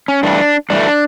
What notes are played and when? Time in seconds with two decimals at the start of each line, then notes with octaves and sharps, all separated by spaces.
0.08 C#4
0.23 G2 E3 A3 D4
0.70 G2 E3 A3 D4